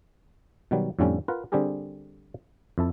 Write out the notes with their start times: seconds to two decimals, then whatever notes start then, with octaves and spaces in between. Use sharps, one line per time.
0.71 B2 D#3 F#3 G3
0.99 F2 A2 D3 F3 G3 C#4
1.28 F4 A#4 B4 F#5
1.52 D3 G3 C4 G4 G#4 A#4
2.78 F2 E4 A4